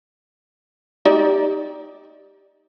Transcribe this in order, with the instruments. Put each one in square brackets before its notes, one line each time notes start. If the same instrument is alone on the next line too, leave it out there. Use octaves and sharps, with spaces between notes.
[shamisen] D#4 G4 D5